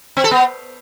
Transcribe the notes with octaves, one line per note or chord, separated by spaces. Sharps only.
C4
A4
B3